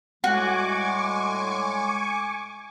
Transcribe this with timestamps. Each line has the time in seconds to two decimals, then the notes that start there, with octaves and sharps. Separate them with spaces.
0.24 A2 G3 G#3 F#4 G#5 C#6 D6